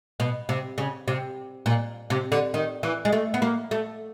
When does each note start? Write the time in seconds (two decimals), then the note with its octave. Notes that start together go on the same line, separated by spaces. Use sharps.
0.20 B2
0.49 C3
0.78 C#3
1.08 C3
1.66 A#2
2.10 C3
2.32 D3
2.54 D#3
2.83 E3
3.05 G#3
3.12 A3
3.34 B3
3.42 A#3
3.71 A3